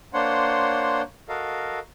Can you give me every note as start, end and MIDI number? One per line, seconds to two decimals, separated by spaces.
0.14 1.02 58
0.14 1.02 62
0.14 1.02 72
0.14 1.02 73
0.14 1.02 78
0.14 1.02 84
1.29 1.79 66
1.29 1.79 69
1.29 1.79 70
1.29 1.79 75
1.29 1.79 77